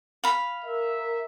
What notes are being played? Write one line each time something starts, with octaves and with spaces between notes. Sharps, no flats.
F5 B5
A#4 E5